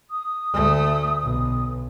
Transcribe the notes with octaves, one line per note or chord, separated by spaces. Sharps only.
D#6
D2 A3
B1